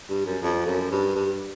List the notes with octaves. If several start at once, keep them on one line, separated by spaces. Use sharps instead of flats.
G2
F#2
F2
F#2
G2
G2